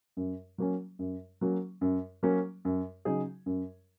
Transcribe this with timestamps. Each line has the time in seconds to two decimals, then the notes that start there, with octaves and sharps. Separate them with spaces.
0.17 F#2
0.58 F#3 A#3 C#4
0.99 F#2
1.41 F#3 A#3 C#4
1.81 F#2
2.23 F#3 A#3 C#4
2.65 F#2
3.05 C#3 F#3 D#4 G#4
3.46 F#2